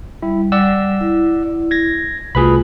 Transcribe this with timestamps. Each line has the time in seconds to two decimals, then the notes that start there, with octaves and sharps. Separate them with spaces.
0.23 G3 E4
0.52 G3 D5 F#5 E6
1.01 E4
1.71 G#6 A#6
2.35 C2 A3 F4 F#4 G#4 B4 B5